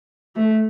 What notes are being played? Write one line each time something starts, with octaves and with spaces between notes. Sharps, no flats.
A3